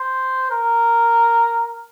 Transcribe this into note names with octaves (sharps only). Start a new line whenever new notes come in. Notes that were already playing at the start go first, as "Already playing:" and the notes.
Already playing: C5
A#4